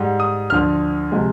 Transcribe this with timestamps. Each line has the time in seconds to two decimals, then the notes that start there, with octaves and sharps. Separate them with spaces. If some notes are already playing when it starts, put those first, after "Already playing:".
Already playing: G#2 G3
0.20 D#6
0.50 D2 D3 F3 F6
1.12 C3 F3 G#3